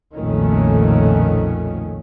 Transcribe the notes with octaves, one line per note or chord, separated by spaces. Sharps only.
B1 F2 A#2 D#3 A3 C#4